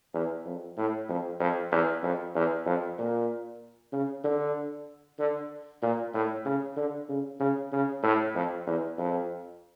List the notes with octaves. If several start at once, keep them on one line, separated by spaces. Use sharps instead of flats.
E2
F2
A2
F2
F2
E2
F2
E2
F2
A#2
C#3
D3
D3
A#2
A2
C#3
D3
C#3
C#3
C#3
A2
F2
E2
F2